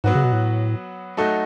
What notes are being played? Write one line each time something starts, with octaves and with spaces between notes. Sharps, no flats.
G#2 F#3 B3 F#4
C#3
B2
A2
F#3 A3 D#4 F#4 A4